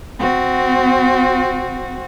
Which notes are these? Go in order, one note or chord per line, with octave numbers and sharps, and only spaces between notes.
C4 F#4